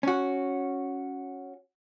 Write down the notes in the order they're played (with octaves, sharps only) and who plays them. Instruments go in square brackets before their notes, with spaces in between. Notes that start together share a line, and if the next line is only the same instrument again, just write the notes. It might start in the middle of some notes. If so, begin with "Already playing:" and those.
[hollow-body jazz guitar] C#4 F#4